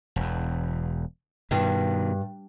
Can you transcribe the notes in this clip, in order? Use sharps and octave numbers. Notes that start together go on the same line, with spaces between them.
E1 E2
G2 B2 D#3